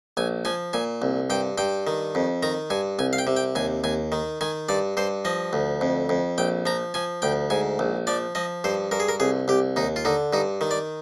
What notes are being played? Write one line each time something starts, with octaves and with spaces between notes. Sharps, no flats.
A#1 G#5
F3 G#5
A#2 G#5
C2
G2 G5
G2 G5
D#3
F2
D#3 A#5
G2 G#5
C2 G#5
F5
G5
C3
G5
D#2 G#5
D#2 G#5
D#3
D#3 G#5
G2 D5
G2 C5
F3 D#5
D2
F2
F2
A#1 G5
F3 A#5
F3 G#5
D2 G5
G#2 G#5
A#1
F3 D5
F3 D#5
G2 C5
G2 A#4
G#4
A#4
C2 G#4
C2 G4
D#2 D#4
F4
D3 D#4
G2 D#4
D#3
D5